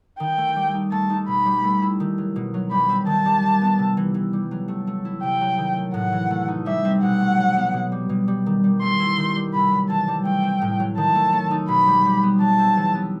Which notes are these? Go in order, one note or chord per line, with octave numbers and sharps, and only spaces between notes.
D#3 G5
A3
G3
D#4
A3 A5
D#4
B2 B5
G3
A3
E4
D#3
F#3
B2
F#3
G3 B5
C4
D#3 A5
G3
G3
B3
C3
E3
E3
G3
F#3
A3
A3
E4
C3 G5
F#3
D#3
A3
A2 F#5
E3
A3
D#4
G3 E5
C4
B2 F#5
A3
F#3
B3
B2
G3
B2
G3
D#3
G3
A3 C6
E4
D#3
G3
C3 B5
F#3
E3 A5
G3
A3 G5
C4
A2
F#3
D#3 A5
A3
A3
D#4
B2 B5
G3
G3
B3
F#3 A5
C4
E3
B3